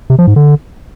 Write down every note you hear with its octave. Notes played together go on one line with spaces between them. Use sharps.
C3
F3
G#2
D3